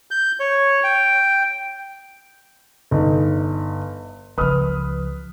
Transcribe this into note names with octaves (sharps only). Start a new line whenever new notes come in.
G6
C#5
G5
G1 D#4
C#2 F3 B4 D#6 F6